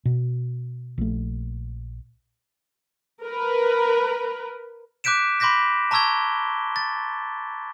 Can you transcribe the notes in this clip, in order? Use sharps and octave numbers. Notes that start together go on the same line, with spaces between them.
B2
A#1 A3
A#4 B4
D6 F#6 G6 B6 D7 E7
B5 C6 D6 G6 A#6 B6
A5 A#5 C#6 E6 G#6 G7
A6